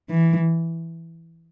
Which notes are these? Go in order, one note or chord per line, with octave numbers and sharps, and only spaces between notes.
E3